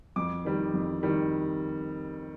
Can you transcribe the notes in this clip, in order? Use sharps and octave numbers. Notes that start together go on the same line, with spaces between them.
F2 D6
D#3 G3
F2
D#3 G3